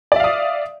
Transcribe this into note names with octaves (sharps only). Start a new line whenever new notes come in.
D5 E5 F5 D#6